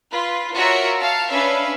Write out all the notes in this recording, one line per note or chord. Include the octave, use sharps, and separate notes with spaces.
F4 B4
F4 F#4 A#4 C#5 E5 F#5
F5 A5
C#4 D4 B4 E5 F5